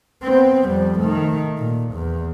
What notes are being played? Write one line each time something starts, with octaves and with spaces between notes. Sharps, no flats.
B3 C4
F2 G3
D#3 A3
A#2
E2